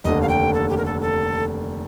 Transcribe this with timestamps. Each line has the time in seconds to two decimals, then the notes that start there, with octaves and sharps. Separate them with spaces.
0.04 F1 D#2 D3 D#5
0.22 F5
0.29 G5
0.53 A4
0.70 G4
0.78 A#4
0.85 A4
1.01 A4